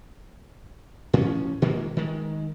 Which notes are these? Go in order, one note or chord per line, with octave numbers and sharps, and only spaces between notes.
A2 F3 C#4
A#2 D#3 G#3 A#3
D#3 G#3